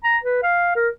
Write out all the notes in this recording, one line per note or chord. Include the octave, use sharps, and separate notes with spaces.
A#5
B4
F5
A#4